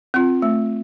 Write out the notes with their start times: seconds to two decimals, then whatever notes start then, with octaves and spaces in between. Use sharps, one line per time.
0.14 C4 F4
0.42 A3